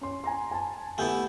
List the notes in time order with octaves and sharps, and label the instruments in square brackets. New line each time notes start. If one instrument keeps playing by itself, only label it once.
[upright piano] C#4 C6
G#5 A#5 C6
G#5 A5
[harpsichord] A3 B3 E4 [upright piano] G4 G#5 G6